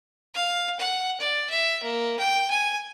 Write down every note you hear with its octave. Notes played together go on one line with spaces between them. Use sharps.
F5
F#5
D5
E5
A#3
G5
G#5